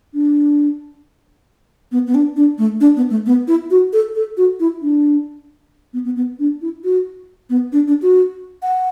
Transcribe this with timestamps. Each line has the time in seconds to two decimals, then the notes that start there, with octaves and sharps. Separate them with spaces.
0.14 D4
1.92 B3
2.07 B3
2.15 D4
2.36 D4
2.58 A3
2.81 D4
2.97 B3
3.10 A3
3.26 B3
3.48 E4
3.71 F#4
3.93 A4
4.15 A4
4.37 F#4
4.60 E4
4.82 D4
5.93 B3
6.05 B3
6.16 B3
6.39 D4
6.62 E4
6.84 F#4
7.50 B3
7.73 D4
7.88 D4
8.02 F#4
8.63 F#5